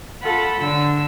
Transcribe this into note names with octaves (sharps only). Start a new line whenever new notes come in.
F4 A4 F#5 B5
D3 E6